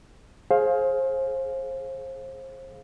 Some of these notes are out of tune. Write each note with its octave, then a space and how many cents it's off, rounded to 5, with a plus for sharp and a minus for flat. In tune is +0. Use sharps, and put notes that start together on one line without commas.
G#4 +25 C5 +30 F5 +5